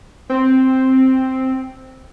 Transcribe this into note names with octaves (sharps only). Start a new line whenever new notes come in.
C4